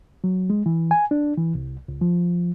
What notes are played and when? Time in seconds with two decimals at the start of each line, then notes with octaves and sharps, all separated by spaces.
0.24 F#3
0.50 G#3
0.66 E3
0.91 G#5
1.11 D4
1.37 E3
1.55 C2
1.88 C#2
2.01 F3